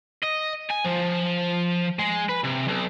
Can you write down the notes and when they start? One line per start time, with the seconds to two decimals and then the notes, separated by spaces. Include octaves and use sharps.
0.23 D#5
0.71 G#5
0.86 F3
1.99 G#3
2.29 B4
2.44 C3
2.68 B1